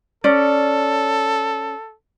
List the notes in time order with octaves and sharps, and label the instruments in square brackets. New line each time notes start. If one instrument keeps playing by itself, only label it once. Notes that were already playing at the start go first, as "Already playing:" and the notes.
[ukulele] C#4 D5 [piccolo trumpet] A4